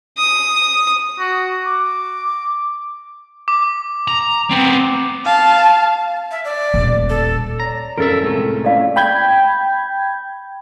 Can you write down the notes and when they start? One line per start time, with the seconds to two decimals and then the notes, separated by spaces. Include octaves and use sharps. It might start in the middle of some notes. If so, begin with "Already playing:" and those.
0.18 D#6
1.19 F#4
1.67 D6
3.48 D6
4.08 A#5
4.51 B3 C4
5.25 F5 A5
6.31 E5
6.45 D5
6.74 D#1
7.09 A4
7.60 C#5 D5 A#5
7.98 F#2 C#3 F3 A4 A#4 E5
8.23 C#2 A2 C3 G#3 A3
8.65 A#3 C#4 E4 D5 F5 B5
8.96 G5 B5 G6 G#6